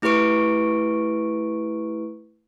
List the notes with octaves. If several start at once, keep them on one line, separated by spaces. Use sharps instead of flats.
A3 E4 G4 B4 C#6 D7